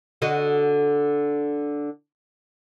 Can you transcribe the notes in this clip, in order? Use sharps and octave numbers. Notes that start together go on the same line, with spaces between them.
D3 F#4 D#5